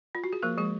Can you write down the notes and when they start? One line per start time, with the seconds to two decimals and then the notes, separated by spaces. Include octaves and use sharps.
0.15 F4
0.24 F#4
0.33 G#4
0.42 F3 A#3 A#4
0.57 F3 G#3 G#4